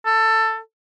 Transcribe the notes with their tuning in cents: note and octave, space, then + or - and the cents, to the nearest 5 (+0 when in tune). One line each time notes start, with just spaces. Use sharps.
A4 +15